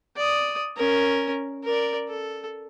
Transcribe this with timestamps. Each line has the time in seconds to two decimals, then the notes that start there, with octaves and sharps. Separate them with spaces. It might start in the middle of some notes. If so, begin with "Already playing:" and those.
0.16 D5 D#6
0.76 C#4 A#4
1.64 A#4 D5
2.09 A4